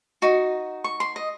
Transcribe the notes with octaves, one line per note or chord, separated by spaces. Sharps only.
D#4 F#4
C#6
C6
D#5